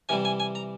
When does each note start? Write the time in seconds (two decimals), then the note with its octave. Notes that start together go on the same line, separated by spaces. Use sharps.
0.09 C3 E3 G3 G#5
0.25 G#5
0.40 G#5
0.55 A#5